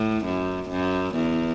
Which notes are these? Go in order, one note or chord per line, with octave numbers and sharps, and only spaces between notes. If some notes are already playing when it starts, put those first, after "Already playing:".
Already playing: A2
F#2
F#2
E2